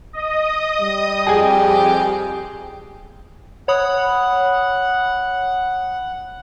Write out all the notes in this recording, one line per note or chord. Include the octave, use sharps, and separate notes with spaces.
D#5 D#6
G3
F2 G4 G#4 G#5
C#5 F#5 B5 D#6